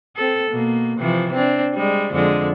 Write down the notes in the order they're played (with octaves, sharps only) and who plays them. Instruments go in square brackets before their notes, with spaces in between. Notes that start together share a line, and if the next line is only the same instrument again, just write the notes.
[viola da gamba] C4 A4
B2 A#3
C3 E3 F3
C4 D4
G3 G#3
F2 D3 G#3